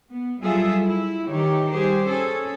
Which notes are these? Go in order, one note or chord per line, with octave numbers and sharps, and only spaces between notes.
B3
F#3 G3 F4 G#4 A4 E5
E4
D#3 E3 G4 C#5
G3 G4 G#4 C5
C#4 G#4 A4